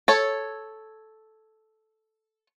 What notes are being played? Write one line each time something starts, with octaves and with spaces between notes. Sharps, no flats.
A4 C#5